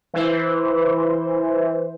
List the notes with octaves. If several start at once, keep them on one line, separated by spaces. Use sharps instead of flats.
E3 C5